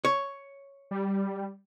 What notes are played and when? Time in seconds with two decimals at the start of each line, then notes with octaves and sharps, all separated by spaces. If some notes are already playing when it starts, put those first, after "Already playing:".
0.05 C#5
0.91 G3